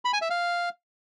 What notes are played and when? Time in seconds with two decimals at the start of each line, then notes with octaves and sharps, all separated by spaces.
0.05 B5
0.13 G#5
0.22 E5
0.30 F5